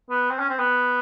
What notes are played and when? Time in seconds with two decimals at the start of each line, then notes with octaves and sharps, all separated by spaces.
0.10 B3
0.30 C4
0.39 C#4
0.49 C4
0.59 B3